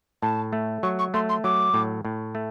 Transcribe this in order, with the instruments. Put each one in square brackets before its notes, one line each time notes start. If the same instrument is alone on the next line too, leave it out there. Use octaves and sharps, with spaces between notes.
[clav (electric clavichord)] A2 [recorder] A5
[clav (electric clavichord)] A3
[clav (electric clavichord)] F#3 [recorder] C#6
[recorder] C#6
[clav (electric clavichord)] A3 [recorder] C6
[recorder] C6
[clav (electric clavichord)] F#3 [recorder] D6
[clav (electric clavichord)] A2
A2
A3